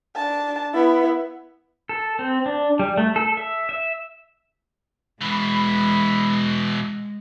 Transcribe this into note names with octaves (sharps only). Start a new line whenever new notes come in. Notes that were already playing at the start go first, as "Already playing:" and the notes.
D4 A5
B3 E4
A4
C4
D4
G3
A3
A4
E5
E5
B2 E3 G#3 B5